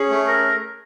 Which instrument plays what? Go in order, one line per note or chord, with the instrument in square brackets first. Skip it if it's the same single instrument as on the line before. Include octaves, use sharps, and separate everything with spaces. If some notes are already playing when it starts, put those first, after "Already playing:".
Already playing: [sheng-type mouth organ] C#4 [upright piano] G#4
[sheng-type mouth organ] A3
A#4